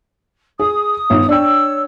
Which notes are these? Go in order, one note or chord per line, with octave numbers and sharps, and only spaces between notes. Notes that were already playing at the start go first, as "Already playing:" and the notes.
G#4 D#6
G1 D#3
D4 C#5 G5 E6